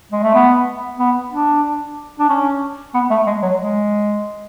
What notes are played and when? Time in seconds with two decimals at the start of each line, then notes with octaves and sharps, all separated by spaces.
0.12 G#3
0.23 A3
0.35 B3
1.00 B3
1.32 D4
2.20 D4
2.30 C#4
2.94 B3
3.10 A3
3.27 G#3
3.43 F#3
3.59 G#3